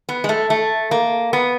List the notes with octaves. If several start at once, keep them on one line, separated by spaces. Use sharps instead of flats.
B3
G#3
A3
A3
A#3
B3